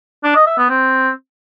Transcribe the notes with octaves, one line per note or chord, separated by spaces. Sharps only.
D4
D#5
E5
B3
C4